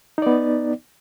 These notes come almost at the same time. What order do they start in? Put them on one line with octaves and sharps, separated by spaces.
D#4 D5 B3